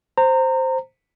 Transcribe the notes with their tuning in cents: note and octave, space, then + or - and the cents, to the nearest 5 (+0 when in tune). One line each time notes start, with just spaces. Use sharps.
C5 +0 A#5 -25